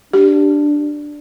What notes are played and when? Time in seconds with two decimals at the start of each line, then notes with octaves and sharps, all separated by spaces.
0.13 D4 G4